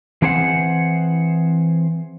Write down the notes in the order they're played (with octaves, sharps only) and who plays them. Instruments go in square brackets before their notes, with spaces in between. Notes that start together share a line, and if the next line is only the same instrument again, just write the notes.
[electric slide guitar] E3 C4 G#4 C5 F5 F#5